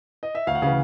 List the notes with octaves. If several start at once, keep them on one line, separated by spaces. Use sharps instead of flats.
D#5
E5
D2 F5
F#5
C#3 E3 F5